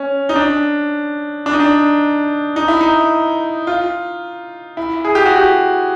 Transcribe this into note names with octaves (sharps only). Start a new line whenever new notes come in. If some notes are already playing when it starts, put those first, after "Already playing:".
Already playing: C#4
D#4
D4
D4
D#4
D4
D#4
E4
D#4
F4
E4
G#4
G4
F#4
G4